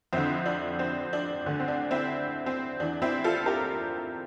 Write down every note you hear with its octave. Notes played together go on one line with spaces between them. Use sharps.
F2 D3 C4 E4
D4
C4
D4
D2 D3
C4
D4
C4 E4
C4
E2 E3 D4
C4 E4
F4 A4
G4 A#4